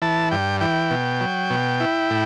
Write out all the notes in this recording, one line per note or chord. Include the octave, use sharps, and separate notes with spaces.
E3 A5
G2 G5
E3 G5
B2
F#3
B2
E4
A2